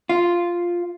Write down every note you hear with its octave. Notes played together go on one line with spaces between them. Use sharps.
F4